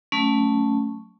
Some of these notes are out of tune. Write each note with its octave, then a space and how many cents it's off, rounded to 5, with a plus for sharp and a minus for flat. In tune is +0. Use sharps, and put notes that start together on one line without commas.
F#3 +0 A3 +0 C#4 +0